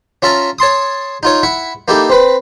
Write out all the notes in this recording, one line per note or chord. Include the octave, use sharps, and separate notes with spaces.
C#4 F4 E5 A5 A#5
C#5 A5 C6 D#6
D#4 F4 C#5
E4 E5 F#5
A#3 D#4 E4 G4 A4
C4 B4